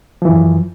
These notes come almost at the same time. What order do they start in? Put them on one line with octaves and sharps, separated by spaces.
F3 E3 F#2